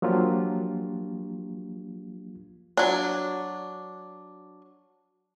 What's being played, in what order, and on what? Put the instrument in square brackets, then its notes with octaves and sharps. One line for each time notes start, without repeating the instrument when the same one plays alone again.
[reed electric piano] F3 F#3 A#3 D4 F4 G4
[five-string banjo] F#3 D4